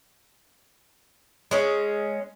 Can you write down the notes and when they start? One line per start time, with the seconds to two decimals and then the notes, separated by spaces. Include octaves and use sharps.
1.51 G#3 C#4